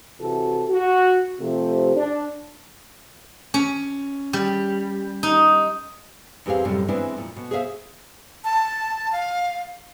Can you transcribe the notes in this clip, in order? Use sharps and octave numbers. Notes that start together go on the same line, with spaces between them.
C3 E3 F#4 A4
F#4
C3 F3 A3 G4
D4
C#4
G3
D#4
E2 C4 G4 G#4 F5
F#2 A2 C3 G3
E3 G#3 B3 C4 D4 E4
F2 A#2
B2
G#4 C5 C#5 E5 F5
A5
F5